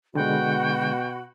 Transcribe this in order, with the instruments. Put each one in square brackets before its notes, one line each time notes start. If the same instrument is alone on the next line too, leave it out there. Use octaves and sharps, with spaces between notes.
[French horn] B2 [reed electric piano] D3 G#3 [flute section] F#4 B5 [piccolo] G5